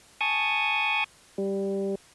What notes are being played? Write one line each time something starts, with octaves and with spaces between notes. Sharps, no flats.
G#5 A5 C#6 D#6
G3